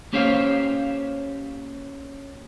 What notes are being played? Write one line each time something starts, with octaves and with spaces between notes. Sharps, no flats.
A#3 C#4 G4 C5 C#5 F5